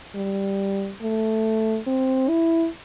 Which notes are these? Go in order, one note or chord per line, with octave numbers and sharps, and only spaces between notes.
G3
A3
C4
E4